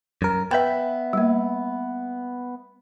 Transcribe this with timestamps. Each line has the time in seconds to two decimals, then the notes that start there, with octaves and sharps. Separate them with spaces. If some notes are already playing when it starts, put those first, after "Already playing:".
0.22 F#2 A#4
0.51 B3 B4 E5 G5
1.13 G3 A#3